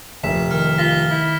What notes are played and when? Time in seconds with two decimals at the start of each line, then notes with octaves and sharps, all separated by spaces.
0.24 F1 A#1 B6 E7
0.51 D#3 F6
0.78 F4 A#6 B6 G7
1.11 E4